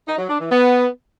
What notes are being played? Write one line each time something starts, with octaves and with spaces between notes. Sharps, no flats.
D#4
F#3
D4
E3
B3